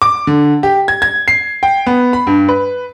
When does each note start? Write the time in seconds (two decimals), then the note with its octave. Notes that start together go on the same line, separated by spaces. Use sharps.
0.02 D6
0.27 D3
0.63 G4
0.88 G#6
1.02 G#6
1.28 C7
1.63 G5
1.86 B3
2.13 B5
2.27 G2
2.49 B4